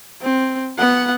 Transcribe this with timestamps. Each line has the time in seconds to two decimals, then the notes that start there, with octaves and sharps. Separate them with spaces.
0.22 C4
0.78 B3 F#5